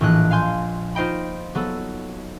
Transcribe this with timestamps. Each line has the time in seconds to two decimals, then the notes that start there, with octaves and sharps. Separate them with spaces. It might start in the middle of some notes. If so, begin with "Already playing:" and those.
0.01 A#1 A2 E3 D#5 F#6
0.31 F5 G#5 C6 G6
0.95 D#4 F4 C5 D#5 G5 B5
1.55 F#3 B3 A4